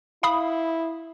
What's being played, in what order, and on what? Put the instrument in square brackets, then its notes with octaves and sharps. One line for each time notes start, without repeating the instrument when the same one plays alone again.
[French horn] E4 [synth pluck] F5 B5 D#6